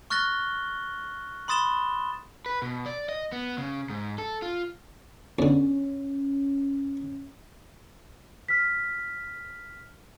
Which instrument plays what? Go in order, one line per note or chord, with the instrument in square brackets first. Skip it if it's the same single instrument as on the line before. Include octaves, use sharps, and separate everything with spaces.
[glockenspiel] C#6 F6 F#6 A6 A#6 G7
B5 C6 D#6 A6 E7 G7
[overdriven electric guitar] B4
B2
D5
D#5
B3
C#3
G#2
A4
F4
[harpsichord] E2 D3 [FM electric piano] C#4
[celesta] F6 B6